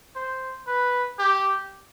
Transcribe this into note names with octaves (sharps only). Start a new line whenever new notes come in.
C5
B4
G4